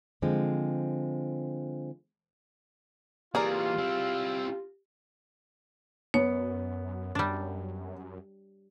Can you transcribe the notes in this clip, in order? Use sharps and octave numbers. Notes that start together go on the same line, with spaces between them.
D3 F3 G#3 C4
E3 A#3 F4 G4 G#4 A#4 D5
C4 E4
F#2 B3 C#5
F#2 G3 D4